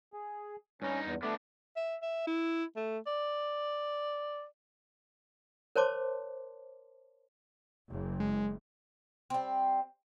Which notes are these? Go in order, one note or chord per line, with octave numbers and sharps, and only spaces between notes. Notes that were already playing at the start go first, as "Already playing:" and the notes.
G#4
G2 C#4 D#4
E2
A3 B3 D4 D6
E5
E5
E4
A3
D5
A#4 C5 C#5 A5 C6 D6
F#1
G#3
G3 C4